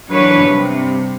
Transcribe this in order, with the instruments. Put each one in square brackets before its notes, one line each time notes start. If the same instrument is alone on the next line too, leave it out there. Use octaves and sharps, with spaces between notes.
[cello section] E3 F#3 D4 B4 C#5
G2 C3